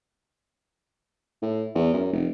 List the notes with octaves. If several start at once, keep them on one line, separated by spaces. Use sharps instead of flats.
A2
E2
F#2
F1